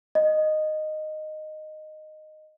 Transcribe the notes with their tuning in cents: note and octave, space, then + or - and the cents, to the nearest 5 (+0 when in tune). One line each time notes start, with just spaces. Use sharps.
D#5 -10